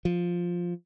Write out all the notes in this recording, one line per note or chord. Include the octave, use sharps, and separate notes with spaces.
F3